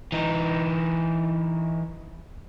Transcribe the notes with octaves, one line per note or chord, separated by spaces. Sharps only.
E3 D#4